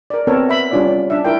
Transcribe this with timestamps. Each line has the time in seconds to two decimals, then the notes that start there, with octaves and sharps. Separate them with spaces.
0.10 A#4 D5
0.27 B3 C4 A4 A#4 C#5
0.49 E5 B5
0.71 G3 C#4 D4 F4 C#5 D5
1.10 D4 E5
1.25 D4 E4 A#4 G5